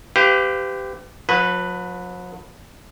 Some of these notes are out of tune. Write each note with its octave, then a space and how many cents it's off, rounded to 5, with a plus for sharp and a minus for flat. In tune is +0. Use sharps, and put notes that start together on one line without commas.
G4 +0 B4 +45 F5 +0
F#3 -45 B4 +0